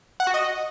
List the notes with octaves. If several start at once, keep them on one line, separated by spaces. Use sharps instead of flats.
F#5
F#4
D#5